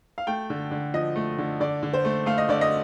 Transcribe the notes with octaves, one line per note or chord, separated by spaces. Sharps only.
F5
A3 G5
D3
D3
F3 D#5
A3
D3
D3 D5
D3
C5
A3
A3 F5
D#5
D3 D5
D#5